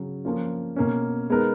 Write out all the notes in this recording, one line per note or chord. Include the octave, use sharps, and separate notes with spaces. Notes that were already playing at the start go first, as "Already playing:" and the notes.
Already playing: C#3 F#3 C#4
F3 A#3 C#4 F4
B2 A#3 C#4
G#3 B3 D#4 A#4